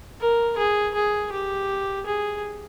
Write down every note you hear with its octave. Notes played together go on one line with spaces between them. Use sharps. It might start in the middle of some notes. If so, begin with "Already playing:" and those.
A#4
G#4
G#4
G4
G#4